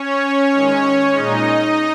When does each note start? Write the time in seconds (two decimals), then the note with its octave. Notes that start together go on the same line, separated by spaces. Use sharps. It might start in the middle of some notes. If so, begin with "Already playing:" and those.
Already playing: C#4 C#5
0.49 D#3 G#3
1.12 A#2 G#3 D#4 D#5